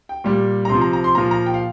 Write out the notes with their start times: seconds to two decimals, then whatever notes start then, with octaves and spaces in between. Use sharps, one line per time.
0.09 G5
0.24 A#2 G3
0.65 A#5
0.69 C3 F3 C6
0.81 A#5
0.93 A#5
1.04 C6
1.15 A#2 F3 A#5
1.31 A#5
1.46 G5
1.54 F5